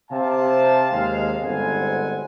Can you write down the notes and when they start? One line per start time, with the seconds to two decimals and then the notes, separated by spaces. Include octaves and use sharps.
0.11 C3 F5 A5
0.91 D#2 G#3 F5
1.43 G1 G#2 B3 C4 F#5 G#5